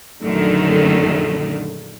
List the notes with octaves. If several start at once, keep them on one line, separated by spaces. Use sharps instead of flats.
A#1 F#2 D3 D#3 A3